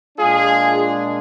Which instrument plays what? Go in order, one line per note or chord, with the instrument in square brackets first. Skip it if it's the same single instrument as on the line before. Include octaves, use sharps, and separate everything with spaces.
[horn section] A#2 G#3 D4 F4 G#4